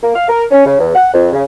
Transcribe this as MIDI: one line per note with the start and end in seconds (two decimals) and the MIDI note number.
0.02 0.14 58
0.15 0.27 77
0.28 0.43 70
0.51 0.63 61
0.65 0.74 49
0.79 0.91 40
0.95 1.08 78
1.13 1.32 41
1.33 1.41 49